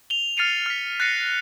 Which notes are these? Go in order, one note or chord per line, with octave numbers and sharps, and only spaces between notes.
F7 G7
F6 A6 C7 C#7 D#7 F7
F6 B6
F#6 A6 A#6 C7 C#7 D#7